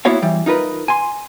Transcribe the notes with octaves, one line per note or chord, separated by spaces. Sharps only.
A#3 B3 E4 F#4 C#5 F5
E3 G3
D#4 F4 A#4 B4
G#5 C6